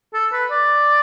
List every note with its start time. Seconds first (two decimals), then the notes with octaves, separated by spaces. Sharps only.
0.14 A4
0.32 B4
0.51 D5